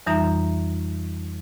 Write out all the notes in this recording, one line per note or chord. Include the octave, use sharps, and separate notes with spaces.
F2 E3 G3 D#4 E5 A#5